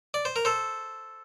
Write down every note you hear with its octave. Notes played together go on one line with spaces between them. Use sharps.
D5
C5
A#4
A4 C5